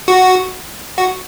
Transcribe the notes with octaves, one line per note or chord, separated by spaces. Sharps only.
F#4
F#4